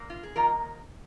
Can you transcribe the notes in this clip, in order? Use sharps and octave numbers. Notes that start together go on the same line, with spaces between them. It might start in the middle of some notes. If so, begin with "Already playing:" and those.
Already playing: A#2 A#3
F4
G#4
C3 D#3 A#3 D#4 F4 A#4